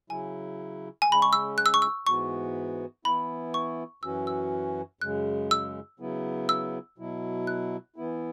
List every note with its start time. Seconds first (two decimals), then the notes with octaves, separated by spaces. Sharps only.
0.10 C#3 F#3 E4 G#5
1.02 G#5
1.08 C#3 G#3 C#4 B5
1.22 C#6
1.33 E6
1.58 F#6
1.66 E6
1.74 C#6
1.82 E6
2.06 G#2 E3 B3 F#4 C#6
3.05 E3 B3 E4 B5
3.54 C#6
4.03 F#2 E3 C#4 F#4 E6
4.27 E6
5.01 F#2 C#3 G#3 F#6
5.51 E6
6.00 C#3 F#3 B3 E4
6.49 E6
6.98 B2 F#3 E4
7.47 F#6
7.96 E3 B3 E4